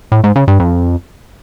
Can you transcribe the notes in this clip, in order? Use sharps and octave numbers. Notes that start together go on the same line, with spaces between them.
A2
G#2
C#3
G2
F2